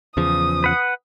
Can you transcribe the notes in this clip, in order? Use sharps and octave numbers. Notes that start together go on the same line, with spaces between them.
E2 C#3 F3 D#6
B4 F#5